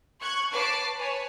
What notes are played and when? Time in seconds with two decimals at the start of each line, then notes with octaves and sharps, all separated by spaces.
0.21 C#6 F#6 G#6
0.52 B4 C#5 A5 D6 C7
0.96 B4 C#5 G#5 A5